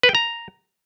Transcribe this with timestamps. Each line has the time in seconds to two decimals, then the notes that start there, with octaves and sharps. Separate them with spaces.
0.03 B4
0.09 G5
0.15 A#5